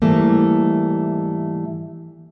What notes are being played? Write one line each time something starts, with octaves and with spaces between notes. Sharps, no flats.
G#2 E3 G3 A3 A#3